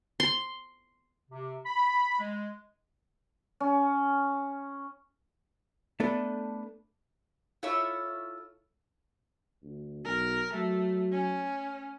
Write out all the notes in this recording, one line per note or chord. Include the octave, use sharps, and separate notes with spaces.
C6
C3
B5
G#3
C#4
A3 B3 D4 A4 B4
E4 F4 A4 C#5 E5
D2
B1 A#4
F#3 A3
C#4